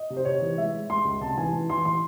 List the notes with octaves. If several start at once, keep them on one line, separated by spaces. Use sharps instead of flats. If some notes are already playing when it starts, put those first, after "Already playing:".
Already playing: D#5
C3
C5
C3 C#5
E3
G#3 E5
G#3
G#3 C6
C#2
C2 A5
E3 G#5
E3
E3 C6
E3 C6